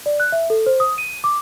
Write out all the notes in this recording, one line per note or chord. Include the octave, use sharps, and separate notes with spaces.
D5
F#6
E5
A4
C5
D#6
D#7
D6